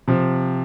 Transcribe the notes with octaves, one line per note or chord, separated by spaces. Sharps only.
C3 F3